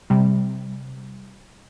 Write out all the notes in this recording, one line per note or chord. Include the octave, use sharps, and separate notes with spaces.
C3 G3